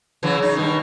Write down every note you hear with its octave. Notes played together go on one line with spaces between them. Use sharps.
C#3 E3 F#3
C#3 D#4
G2 B2 D#3